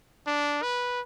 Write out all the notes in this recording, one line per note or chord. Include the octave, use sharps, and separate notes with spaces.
D4
B4